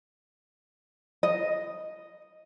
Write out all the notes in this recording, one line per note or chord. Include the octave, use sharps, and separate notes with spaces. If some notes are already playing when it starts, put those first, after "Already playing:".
D#5